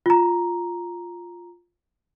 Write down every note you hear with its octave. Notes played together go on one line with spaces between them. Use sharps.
F4 A#5